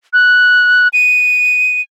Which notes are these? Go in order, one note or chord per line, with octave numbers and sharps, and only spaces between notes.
F#6
D#7